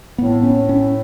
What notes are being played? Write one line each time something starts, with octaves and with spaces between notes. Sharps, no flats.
A2 B3
C#4
C#4